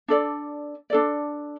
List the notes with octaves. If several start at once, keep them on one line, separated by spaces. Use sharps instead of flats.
D4 A4 D5
D4 A4 D5